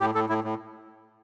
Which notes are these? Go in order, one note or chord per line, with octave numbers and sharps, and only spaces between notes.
A2 G4
A2 A4
A2 E4
A2